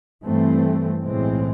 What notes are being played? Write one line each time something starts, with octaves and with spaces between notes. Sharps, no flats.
G2 E3 A3 C4
B1 A2 E3 G#3 C4